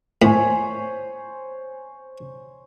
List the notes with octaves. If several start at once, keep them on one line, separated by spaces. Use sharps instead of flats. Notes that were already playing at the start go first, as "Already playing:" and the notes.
A2 C5 C#5 G#5